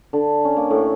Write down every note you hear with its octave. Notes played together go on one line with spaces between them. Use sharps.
D3
C#4
A#3
A2